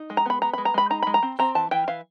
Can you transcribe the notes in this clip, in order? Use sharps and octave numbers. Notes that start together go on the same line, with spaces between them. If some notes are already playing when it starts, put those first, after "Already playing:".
Already playing: D#4
G#3
A#5
B3 B5
B3 A#5
G#3 B5
A#5
G#3 B5
D#4 A#5
G#3 B5
A#5
C4
C4 A#5
E3 A5
E3 G5
E3 F5